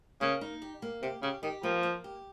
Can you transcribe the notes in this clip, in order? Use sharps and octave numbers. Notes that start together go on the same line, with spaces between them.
C#3 A#3
D#4
G4
A#3
C3 G4
C#3 G4
D#3 G4
F3 A#3
A#3
G4